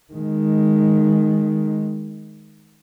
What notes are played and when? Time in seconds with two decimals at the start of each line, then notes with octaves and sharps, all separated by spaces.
0.13 D#3 G#3